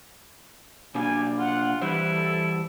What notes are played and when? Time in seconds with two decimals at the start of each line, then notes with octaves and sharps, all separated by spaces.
0.95 B2 G3 A#3 D4 G#5
1.39 F4 F#5
1.82 E3 G3 E4 B4 C5
2.14 A4